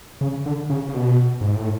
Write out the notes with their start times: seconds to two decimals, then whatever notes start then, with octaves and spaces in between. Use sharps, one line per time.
0.21 C#3
0.46 D3
0.70 C#3
0.89 C#3
0.94 B2
1.41 G#2
1.55 A2